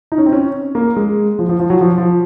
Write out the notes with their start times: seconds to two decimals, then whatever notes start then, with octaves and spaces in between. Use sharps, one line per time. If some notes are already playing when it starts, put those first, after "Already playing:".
0.12 D#4
0.18 C#4
0.26 C4
0.33 C#4
0.75 A#3
0.96 G#3
1.39 F3
1.49 F3
1.60 F3
1.70 F#3
1.81 F3
1.98 F3